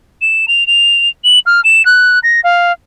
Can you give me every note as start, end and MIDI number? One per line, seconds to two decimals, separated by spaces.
0.22 0.46 100
0.48 0.66 101
0.67 1.09 101
1.24 1.39 102
1.46 1.61 89
1.64 1.85 100
1.85 2.19 90
2.23 2.40 94
2.44 2.72 77